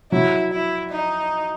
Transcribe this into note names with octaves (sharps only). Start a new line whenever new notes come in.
F#3 E4
E4
D#4